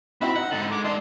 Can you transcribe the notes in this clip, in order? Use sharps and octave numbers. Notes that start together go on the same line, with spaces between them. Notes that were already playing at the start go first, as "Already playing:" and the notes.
C4 D#4 E4 F#4 B5
D#4 F#5
G#2 D3 A4
G#3 D6
G#3 D4 D#4 A5 C6